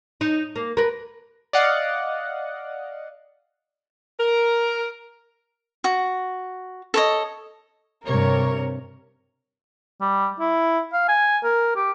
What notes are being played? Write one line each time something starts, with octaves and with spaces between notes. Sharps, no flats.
D#4
A#3
A#4 B4
D5 D#5 F5 F#5
A#4
F#4
A4 C#5 D#5
G2 C3 A#4 C#5
G3
E4
F5
G#5
A#4
G4